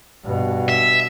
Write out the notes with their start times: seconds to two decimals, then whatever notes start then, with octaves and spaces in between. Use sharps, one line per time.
0.25 G2 B2
0.69 E5